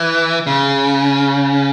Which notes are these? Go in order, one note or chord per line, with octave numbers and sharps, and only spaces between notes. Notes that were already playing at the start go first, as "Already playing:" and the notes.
Already playing: E3
C#3